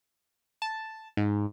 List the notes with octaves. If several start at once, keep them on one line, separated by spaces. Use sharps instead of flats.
A5
G#2